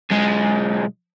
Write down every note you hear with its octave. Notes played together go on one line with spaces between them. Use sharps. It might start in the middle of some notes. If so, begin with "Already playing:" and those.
B1 G#3